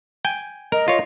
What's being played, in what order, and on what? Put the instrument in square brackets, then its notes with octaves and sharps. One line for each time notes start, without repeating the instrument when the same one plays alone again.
[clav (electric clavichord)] G5 G#5
[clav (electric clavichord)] A#4 [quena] D#5
[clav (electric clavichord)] F4 C#5